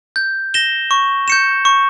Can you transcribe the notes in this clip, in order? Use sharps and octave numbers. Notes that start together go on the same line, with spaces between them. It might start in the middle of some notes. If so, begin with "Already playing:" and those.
G6
A#6 E7 G7
C#6
G6 C#7 E7
C#6